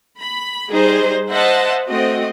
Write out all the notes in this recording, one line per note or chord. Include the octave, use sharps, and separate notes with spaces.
B5
G3 D#4 G#4 C5
C5 D#5 E5 F#5 A5
A3 C4 F#4 D#5